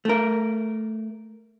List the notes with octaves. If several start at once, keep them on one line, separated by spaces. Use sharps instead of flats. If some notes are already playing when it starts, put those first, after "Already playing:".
A3 A#4